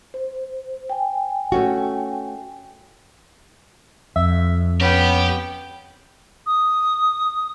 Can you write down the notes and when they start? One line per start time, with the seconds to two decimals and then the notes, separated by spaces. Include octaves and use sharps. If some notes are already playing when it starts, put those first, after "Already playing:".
0.14 C5
0.90 G5 G#5
1.52 A3 C#4 F#4
4.16 F2 E5
4.81 B3 C#4 G4 G5
6.46 D#6